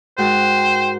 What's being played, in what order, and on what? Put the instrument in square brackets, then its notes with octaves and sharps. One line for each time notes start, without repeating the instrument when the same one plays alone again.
[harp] G#2 F#4 A#4 [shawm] C5 [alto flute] G5